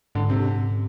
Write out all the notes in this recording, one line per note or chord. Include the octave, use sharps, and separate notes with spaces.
G#2 D3
C3